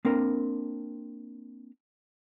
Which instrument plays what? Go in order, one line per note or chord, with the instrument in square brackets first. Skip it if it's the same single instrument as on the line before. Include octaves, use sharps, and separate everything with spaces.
[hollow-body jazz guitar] A#3 C4 D4 A#4